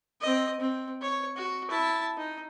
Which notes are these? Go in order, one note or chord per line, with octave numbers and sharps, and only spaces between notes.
C4 D#5
C4
C#5
F#4
E4 A5
D#4